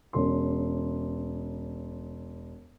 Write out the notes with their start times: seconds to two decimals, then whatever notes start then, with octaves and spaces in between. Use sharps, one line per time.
0.13 E1 C#4 C6